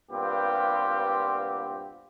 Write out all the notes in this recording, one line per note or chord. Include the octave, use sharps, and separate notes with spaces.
G2 A#2 B3 C4 F4 G4